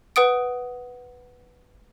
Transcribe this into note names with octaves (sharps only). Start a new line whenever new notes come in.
B4 F#5 D#6 D7